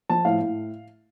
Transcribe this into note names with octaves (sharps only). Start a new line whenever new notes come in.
F3 A5
A2 F5
A2